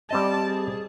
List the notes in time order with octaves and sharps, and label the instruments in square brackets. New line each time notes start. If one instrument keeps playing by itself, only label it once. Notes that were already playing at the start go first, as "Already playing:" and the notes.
[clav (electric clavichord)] G3 C4 D#5 [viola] D5 A5
[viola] G#4